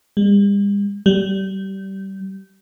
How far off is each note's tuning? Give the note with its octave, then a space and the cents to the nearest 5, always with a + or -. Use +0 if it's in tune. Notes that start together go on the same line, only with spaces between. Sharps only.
G3 +45
G3 -25